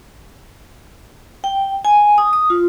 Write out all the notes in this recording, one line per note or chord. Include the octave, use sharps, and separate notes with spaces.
G5
G#5
D#6
D#6
F4